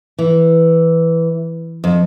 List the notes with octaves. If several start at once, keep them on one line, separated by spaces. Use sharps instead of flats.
E3
F2